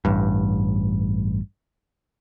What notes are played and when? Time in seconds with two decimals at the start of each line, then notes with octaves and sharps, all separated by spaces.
0.05 A1 G2